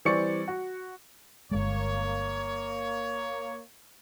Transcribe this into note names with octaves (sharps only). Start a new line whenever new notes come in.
E3 G3 C4 D5 C#6 C#7
F#4
G1 G#3 A#3 C#5